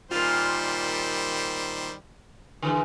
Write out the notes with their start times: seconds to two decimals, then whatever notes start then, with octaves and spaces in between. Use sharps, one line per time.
0.11 A#2 D#3 G3 F4 C5
2.62 D3 E3 G#3